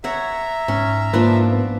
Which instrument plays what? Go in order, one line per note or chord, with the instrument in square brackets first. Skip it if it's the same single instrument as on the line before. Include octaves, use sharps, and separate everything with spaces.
[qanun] C#5 F#5 [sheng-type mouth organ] E5 A#5
[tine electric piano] G#2 [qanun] C#4
[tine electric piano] G#2 B4 [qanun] F3 D4 D5 [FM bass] A#3
[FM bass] B3